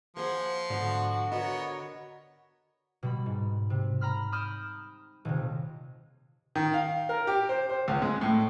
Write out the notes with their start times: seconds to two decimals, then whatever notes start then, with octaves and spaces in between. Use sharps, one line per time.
0.17 F3 A#3 G#4 C5 F#5
0.70 G#2 D3 B3 F#4
1.32 B3 F#4 A#4 C#5 D#5
3.03 B2 G3 B5
3.26 G#2
3.70 C3
4.01 A#5 B5 F6
4.32 B5 D6 D#6 F6 G6 E7
5.25 D#1 C3
6.55 D#3
6.74 F5
7.09 A#4
7.27 G4
7.49 C5
7.70 C5
7.88 C#2
8.02 G#3
8.21 A2